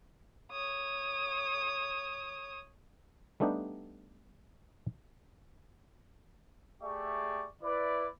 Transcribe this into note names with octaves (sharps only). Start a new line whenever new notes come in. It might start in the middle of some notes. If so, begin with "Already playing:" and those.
C#5 D#6
G3 A3 B3 D4 D#4 G4
A3 G4 G#4 D5 E5 C#6
E4 B4 D5